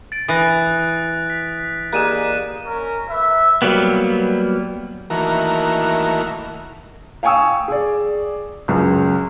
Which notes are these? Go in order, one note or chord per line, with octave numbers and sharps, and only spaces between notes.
A6 D7
E3 D#6 F#6 A#6
B6
A#3 G4 G#4 D5 D#5 F#6 D#7 E7
C#4 A#4
B4 E5
F#3 G3 A#3 B3
D#3 E3 A3 A#3 F#4 A#4
F5 G5 G#5 C#6 D#6 E6
G#4 D5
C#2 F#2